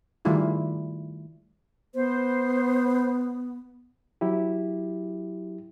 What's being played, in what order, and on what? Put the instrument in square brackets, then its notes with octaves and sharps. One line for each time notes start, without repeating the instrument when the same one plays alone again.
[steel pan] D#3 G3 A3 E4 F4 G#4
[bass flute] B3 [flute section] C5
[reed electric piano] F#3 E4 G4